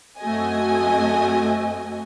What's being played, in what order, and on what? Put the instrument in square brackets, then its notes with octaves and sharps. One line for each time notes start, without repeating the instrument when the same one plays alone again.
[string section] F#2 A3 C4 F#4 D#5 G#5